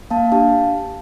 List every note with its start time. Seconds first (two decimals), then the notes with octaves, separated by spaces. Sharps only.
0.11 A#3 F5 A5
0.32 D4 G4 F5 A5